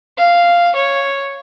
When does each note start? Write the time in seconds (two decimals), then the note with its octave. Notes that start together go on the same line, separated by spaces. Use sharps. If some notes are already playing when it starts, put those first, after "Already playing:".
0.18 F5
0.76 C#5